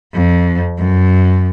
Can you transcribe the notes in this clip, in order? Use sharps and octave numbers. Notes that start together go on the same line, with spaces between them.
F2
F#2